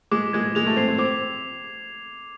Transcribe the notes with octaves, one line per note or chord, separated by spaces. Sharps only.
G#3 D6
G#3 G#6
G#3 F7
A3
C4 C7
C4
C4 D6